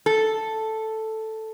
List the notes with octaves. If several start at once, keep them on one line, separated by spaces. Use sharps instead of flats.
A4